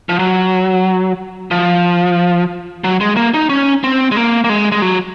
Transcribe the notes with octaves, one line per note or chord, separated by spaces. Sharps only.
F3
F#3
F3
F#3
G#3
A#3
D#4
C#4
C4
G#3
A#3
A#3
G#3
G#3
F#3